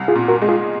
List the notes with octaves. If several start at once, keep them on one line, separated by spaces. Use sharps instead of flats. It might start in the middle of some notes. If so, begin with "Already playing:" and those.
Already playing: C2
F4 G#4
A#2
F#4 A#4
G#3
F4 G#4